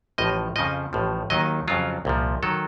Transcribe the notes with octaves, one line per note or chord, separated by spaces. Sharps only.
A1 A2 F3 D#5
F2 C#3 F3 D#5
A1 A2 F3
D#2 D#3 F#3 D#5
F2 C#3 F#3 F4
C2 A#2 F3
D#3 F#3 A4